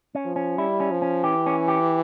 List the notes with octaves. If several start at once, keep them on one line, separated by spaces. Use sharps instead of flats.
C#4
F3
C#4
G3 E4
C#4
F3
C#4
E3 G4
C#4
G4